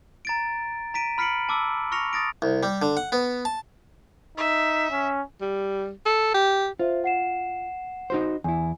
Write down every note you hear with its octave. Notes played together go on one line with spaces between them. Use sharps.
A#5 A6 D7
A#5 B6 D7 D#7
B5 F6 B6 C#7 D7 F#7
A5 D6 E6
C#6 F6 A#6 C#7 F7
D#6 A6 A#6 D7
C2
G3
D3
F#5
B3
A5
D#4 E5
C#4
G3
A4
G4
F4 C5 E5
F#5 C7 E7
D#4 F#4 C5
E2 E4 G#5